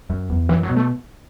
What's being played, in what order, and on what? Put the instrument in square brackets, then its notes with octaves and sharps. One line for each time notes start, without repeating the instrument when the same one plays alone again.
[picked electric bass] F#2
E2
[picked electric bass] F#2 [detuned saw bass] E3
[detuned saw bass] F#3
[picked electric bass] B2
[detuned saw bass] A3